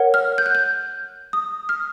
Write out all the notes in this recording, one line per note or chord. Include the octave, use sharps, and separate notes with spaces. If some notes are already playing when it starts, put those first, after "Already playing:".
Already playing: A#4 C#5 F#5
F6
G6
F#6
G6
D#6
F6